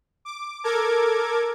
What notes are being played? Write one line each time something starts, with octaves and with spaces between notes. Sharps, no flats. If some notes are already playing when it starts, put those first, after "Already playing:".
D6
A4 A#4 D6 G#6